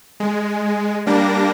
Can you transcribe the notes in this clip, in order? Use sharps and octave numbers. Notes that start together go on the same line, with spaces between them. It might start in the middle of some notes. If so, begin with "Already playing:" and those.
G#3
G3 A#3 D4 A#6